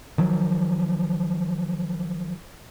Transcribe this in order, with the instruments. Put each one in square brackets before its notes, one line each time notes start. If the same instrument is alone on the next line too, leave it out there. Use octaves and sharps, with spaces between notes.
[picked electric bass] D#3 F3 F#3